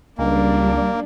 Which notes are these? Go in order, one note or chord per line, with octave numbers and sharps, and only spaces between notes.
C#2 G3 A#3 D4